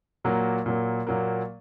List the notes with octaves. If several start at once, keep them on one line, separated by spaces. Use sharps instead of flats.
A#2 F#3 A#3
A#2 F#3 A#3
A#2 F#3 A#3